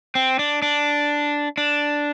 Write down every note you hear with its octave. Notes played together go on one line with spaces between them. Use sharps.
C4
D4
D4
D4